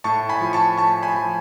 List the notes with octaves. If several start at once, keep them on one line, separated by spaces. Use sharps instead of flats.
A2 A5 C#6
G#5 B5
F3
A5 C#6
A2 A5 C#6
G#5 B5
F3